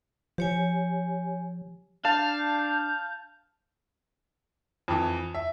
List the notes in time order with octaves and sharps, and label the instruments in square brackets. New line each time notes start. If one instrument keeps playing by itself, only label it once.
[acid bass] F3 [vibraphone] G4 C#5 G#5
[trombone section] D4 [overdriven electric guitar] F5 [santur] A5 [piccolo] G6
[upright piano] F2 E3
E5